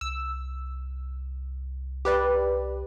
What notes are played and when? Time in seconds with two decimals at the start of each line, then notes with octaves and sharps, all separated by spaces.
0.01 C2 E6
2.05 G4 B4 D5